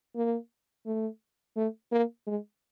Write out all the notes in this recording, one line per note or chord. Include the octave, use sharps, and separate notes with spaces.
A#3
A3
A3
A#3
G#3